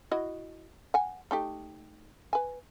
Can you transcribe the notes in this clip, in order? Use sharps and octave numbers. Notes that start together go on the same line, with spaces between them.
E4 F#4 D#5
F#5 G#5
A3 D#4 G4
B4 G#5